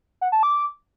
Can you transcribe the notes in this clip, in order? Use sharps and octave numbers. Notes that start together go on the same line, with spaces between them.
F#5
A5
D6